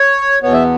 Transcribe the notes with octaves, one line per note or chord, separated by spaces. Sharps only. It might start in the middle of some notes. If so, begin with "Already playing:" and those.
Already playing: C#5
E2 B2 B3 C#5
E5